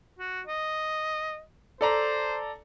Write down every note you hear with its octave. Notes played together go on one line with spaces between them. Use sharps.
F#4
D#5
A4 C5 D5 A#5